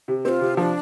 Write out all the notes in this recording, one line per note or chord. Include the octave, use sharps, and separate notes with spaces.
C3
C4 F4 G4
C3
F3 D4